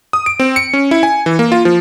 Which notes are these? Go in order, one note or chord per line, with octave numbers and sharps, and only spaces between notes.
D#6
D7
C4
C#7
C#4
E4
G#5
E3
A#3
F4
F3